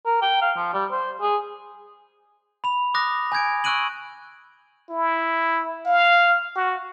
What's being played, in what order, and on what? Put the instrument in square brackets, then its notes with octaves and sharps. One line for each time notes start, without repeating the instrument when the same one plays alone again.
[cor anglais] A#4
G5
F5
F3
G3
C5
G#4
[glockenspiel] B5 F7
D6 D#6 F#6 A#6
G#5 G6 G#6 D7
C#6 E6 F#6 D7 D#7 F#7
[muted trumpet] E4
F5
F#4